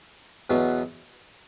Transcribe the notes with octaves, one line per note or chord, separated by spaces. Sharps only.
E2 B2 F#3 B3